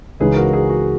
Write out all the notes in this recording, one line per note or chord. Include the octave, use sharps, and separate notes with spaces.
C#2 C#3 E3 G#3 D#4 G#4 B4
F#4 A#4
G#4
F#4